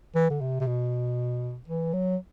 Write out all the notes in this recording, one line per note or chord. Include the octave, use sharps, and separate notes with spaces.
E3
D3
C3
C3
B2
E3
F#3